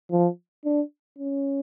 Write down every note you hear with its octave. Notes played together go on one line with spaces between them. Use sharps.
F3
D4
C#4